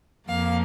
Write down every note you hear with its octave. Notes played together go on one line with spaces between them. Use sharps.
F2 F3 A#3 F5